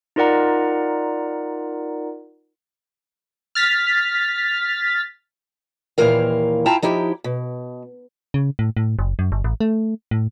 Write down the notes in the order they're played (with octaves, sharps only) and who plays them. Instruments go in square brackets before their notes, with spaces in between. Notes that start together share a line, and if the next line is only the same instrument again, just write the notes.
[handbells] D#4 F4 A#4 D5 F#5 A#5
[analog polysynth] F6 A6 B6
[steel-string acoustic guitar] D#2 A#2 E3 E4 A#4 F5
E4 F4 G5 A5 A#5
F3 D#4 E4 G4
B2
[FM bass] C#3
A2
A2
F#1
F#2
G1
A1
A3
A2